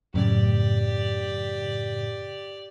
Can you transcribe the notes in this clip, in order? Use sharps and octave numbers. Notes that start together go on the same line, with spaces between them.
F#2 A2 C#3 G4 D5